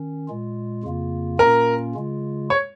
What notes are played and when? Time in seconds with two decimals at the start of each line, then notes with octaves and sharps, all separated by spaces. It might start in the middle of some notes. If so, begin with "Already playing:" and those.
Already playing: D#3 C#4
0.28 A#2 G#3 F4
0.83 F2 C#3 A#3 F4
1.39 A#2 A#3 C#4 F4 A#4
1.95 C#3 G#3 F4
2.50 C#5